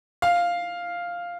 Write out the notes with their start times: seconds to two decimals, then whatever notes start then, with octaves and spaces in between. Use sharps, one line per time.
0.22 F5